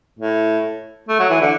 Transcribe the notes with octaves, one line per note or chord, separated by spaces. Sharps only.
A2
A3
F#3
E3
D3